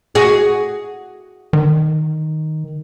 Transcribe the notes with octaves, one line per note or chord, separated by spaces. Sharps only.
F#4 G#4
D#3